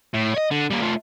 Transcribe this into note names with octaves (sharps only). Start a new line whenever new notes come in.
A2
C#5 D#5
D3
G3 A#3
A3 F4